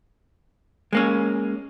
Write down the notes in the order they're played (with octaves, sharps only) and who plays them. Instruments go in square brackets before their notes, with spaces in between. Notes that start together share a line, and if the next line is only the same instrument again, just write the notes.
[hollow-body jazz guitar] G#3 A#3 C#4